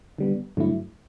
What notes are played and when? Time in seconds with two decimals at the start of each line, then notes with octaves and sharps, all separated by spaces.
0.18 D3 G3 B3
0.57 G2 D3 F#3 A3 E4